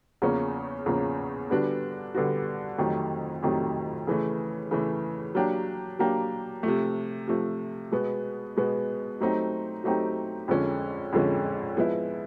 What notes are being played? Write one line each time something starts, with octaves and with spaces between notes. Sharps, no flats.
E2 C#3 F3 A#3 C#4
E2 C#3 F3 A#3 C#4
D3 G3 B3 D4 F#4
D3 G3 B3 D4 F#4
F2 C3 D#3 F#3 A3
F2 C3 D#3 F#3 A3
C#3 E3 A3
C#3 E3 A3
F#3 A#3 D4 G4
F#3 A#3 D4 G4
C3 F3 A3
C3 F3 A3
B2 G#3 B3
B2 G#3 B3
F#3 A3 C4 D#4 G4
F#3 A3 C4 D#4 G4
F2 D3 F3 G#3 C#4
F2 D3 F3 G#3 C#4
F3 G#3 B3 E4